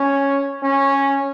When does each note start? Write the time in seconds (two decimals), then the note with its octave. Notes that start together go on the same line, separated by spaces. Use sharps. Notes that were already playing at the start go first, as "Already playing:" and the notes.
Already playing: C#4
0.63 C#4